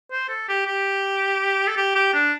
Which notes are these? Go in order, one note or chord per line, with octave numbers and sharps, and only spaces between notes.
C5
A4
G4
G4
A4
G4
G4
D4